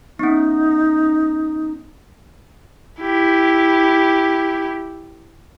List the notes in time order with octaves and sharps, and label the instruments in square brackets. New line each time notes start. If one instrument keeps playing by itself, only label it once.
[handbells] B3 C#4 [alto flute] D#4
[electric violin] E4 G4